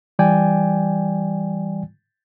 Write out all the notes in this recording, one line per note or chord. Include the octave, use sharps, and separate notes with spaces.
E3 G3 D5 G5 G#5